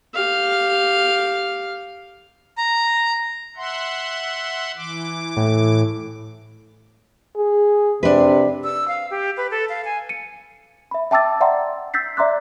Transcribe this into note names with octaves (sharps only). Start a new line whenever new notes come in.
G4 F5
A#5
E5 F#5 C6
E3 D6
A2
G#4
C3 D4 B4
E6
F5
G4
B4
A4
F5
G#5
C#7 D#7
E5 B5
E5 G5 A5 D6 E6 A6
D5 E5 F#5 G5 A#5 C6
E6 G6 A6 B6 C7
D5 E5 A#5 C6 D6 F#6